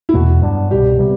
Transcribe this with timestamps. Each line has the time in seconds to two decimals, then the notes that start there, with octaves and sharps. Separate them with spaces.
0.09 E4
0.14 E2 B2 A3 F#4
0.42 G2 F#3 B3 D4
0.70 C2 B2 G3 G4
0.99 C3 G3 B3